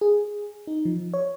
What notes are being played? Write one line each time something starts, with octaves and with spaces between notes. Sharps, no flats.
G#4
D#4
F3
C#5